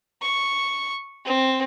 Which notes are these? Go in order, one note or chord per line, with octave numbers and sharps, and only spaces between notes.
C#6
C4